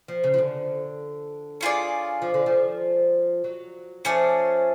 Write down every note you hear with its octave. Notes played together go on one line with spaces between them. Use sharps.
F3
C#3
F3
D3
C#4 F4 G#4 D5
F3
D3
F3
F#3
F3 A3 C#4 G#4 D5